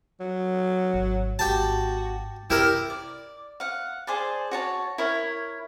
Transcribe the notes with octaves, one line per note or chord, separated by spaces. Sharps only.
F#3
G#1
G#1 G#2 F#4 G4 A5
F#2 C3 E4 G4 A#4
D5
F5 F#5
G#4 C5 D5 A5
F#4 C#5 A5
E4 A#4 C#5